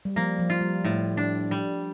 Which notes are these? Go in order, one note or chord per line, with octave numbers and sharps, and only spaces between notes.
G3
F3 A#3
F3
F4
G3
A2
D4
G3